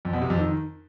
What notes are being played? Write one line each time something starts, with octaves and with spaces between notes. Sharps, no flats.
F2
B2
C3
F2
D#3